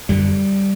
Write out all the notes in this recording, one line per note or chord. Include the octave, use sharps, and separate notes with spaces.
F#2 D3 G3